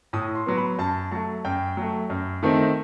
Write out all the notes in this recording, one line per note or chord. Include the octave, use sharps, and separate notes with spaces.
A2 D#6
C6
F#3 B3
B5
F#2 A5
F#3 A3 A5
F#2 G5
F#3 A3
F#2
D#3 A3 C4 D#4